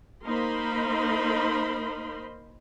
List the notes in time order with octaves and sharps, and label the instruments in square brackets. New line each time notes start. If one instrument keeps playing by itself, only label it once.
[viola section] A#3 D#4 A#4 C5 B5 C6